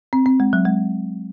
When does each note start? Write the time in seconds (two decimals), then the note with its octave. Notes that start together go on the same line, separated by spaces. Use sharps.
0.13 C4
0.26 C4
0.40 G#3
0.53 F#3
0.65 G#3